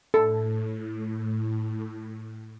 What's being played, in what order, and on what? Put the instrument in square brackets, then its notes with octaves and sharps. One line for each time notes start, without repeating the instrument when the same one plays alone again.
[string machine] A2 [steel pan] A4